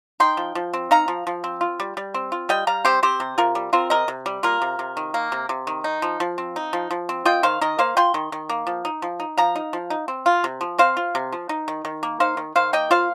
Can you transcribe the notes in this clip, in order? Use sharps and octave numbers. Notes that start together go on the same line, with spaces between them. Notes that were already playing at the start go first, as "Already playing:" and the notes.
D#4 G5 C6
F3
F3
C4
D#4 F5 A#5
F3
F3
C4
F4
G3
G3
C4
F4
G3 D#5 G5
G3 F5 A#5
C4 G4 C5
C4 G4 C5
C3
C3 F4 A#4
G3
C4 F4 A#4
C3 A#4 D#5
C3
G3
A#3 F4 A#4
C3
C3
D#3
A#3
C3
C3
D#3
D#4
F3
F3
C4
D#4
F3
F3
C4
F4 D#5 G5
D#3 C5 F5
D#3 A#4 D#5
A#3 C5 F5
F4 G5 C6
D#3
D#3
A#3
F3
D#4
F3
D#4
F3 F5 A#5
D#4
F3
D#4
C4
F4
C3
F3
C4 C5 F5
F4
C3
F3
D#4
D#3
D#3
A#3
D#4 C5 F5
D#3
D#3 C5 F5
A#3 D#5 G5
F4 C5 F5